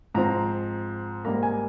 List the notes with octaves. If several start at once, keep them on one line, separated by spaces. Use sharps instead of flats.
G#2 F3 C4 A#5
G#2 G3 A#3 A#5
G#5